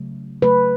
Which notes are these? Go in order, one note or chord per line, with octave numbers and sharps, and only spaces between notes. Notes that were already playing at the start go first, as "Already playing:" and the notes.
Already playing: C#3 F#3 A3
C#3 F#3 A3 B4